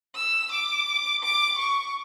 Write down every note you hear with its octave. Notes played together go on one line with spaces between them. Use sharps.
E6
D6
D6
C#6